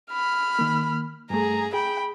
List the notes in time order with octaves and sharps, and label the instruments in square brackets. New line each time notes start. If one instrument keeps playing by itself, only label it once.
[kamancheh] B5 F6
[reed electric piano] D#3 A#3
[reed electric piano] G2 A3 [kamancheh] G#4 A#5
[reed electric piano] G#4 [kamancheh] G5 B5